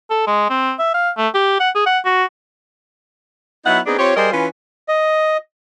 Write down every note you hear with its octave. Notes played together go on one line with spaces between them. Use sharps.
A4
G#3
C4
E5
F5
A3
G4
F#5
G#4
F#5
F#4
F#3 B3 D#4 E4 E5 F#5
B3 C4 D4 D#4 G#4
C4 F4 G4 C#5
G3 G#4 A#4 C5 D5 D#5
E3 C#4 F4 B4
D#5